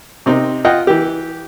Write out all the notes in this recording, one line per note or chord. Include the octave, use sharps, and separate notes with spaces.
C3 C4 D#4
F4 D#5 F#5 G5
E3 G4